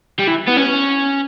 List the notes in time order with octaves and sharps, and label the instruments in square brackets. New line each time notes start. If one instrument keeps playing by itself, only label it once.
[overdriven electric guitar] G3
E3
B3
C#4